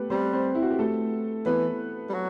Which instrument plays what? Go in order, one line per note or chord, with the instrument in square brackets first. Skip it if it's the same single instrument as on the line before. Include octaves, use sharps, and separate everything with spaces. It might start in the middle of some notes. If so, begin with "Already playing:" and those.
Already playing: [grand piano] A3 B3 G4 A4 B4
[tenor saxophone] G3 [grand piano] C4 C5
[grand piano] C4 C5
E4
F#4
G4
A3 A4
[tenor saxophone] E3 [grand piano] B3 B4
[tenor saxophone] G3
F#3